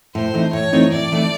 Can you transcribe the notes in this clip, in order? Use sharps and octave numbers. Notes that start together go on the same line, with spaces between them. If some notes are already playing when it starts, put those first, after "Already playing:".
A2 C5
E3 A3 C4 D#4
A2 C#5
E3 A3 C4 D#4
A2 D5
E3 A3 C4 D#4